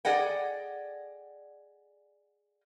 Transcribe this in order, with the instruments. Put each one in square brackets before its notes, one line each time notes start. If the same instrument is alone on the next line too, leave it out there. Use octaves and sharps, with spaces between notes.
[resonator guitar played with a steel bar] G#4 D5 D#5 F#5 G5